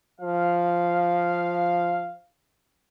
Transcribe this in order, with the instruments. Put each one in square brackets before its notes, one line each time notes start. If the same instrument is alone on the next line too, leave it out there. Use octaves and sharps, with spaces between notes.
[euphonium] F3 [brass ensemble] F5